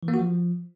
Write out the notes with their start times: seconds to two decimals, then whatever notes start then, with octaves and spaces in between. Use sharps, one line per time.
0.03 E3
0.08 A#3
0.14 F#4
0.19 F3